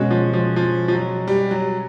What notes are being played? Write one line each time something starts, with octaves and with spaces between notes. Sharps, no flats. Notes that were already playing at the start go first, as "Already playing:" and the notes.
Already playing: B2 G#3 C#4 F#4
F3
F3
F3
F3
F#3
G3
F#3